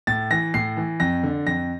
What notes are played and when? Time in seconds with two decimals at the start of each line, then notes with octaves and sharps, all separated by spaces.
0.07 A2 A6
0.31 E3 A#6
0.54 A2 C7
0.77 E3
1.00 F2 A#6
1.23 D3
1.47 F2 A#6